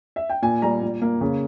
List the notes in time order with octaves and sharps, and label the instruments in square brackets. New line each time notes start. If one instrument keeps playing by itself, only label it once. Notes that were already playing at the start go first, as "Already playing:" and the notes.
[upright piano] E5
G5
A#2 G#5
G3 A#5
A#2
A#3
C#3